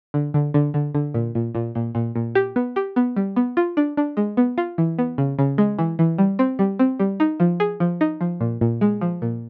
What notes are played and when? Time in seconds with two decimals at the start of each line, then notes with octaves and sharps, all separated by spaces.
0.14 D3
0.34 D3
0.54 D3
0.74 D3
0.95 D3
1.14 A#2
1.35 A#2
1.55 A#2
1.75 A#2
1.95 A#2
2.15 A#2
2.35 G4
2.56 B3
2.76 G4
2.96 B3
3.16 G3
3.36 B3
3.57 F4
3.77 D4
3.97 D4
4.17 G#3
4.37 B3
4.58 F4
4.78 E3
4.99 B3
5.18 C#3
5.39 C#3
5.58 G#3
5.79 E3
5.99 E3
6.18 G3
6.39 C4
6.59 G3
6.79 C4
6.99 G3
7.20 D#4
7.40 F3
7.60 G#4
7.80 F3
8.01 D#4
8.21 F3
8.41 A#2
8.61 A#2
8.81 G#3
9.01 F3
9.22 A#2